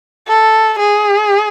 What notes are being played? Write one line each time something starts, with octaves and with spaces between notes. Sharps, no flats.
A4
G#4